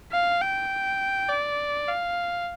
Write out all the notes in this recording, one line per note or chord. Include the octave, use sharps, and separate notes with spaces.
F5
G5
D5
F5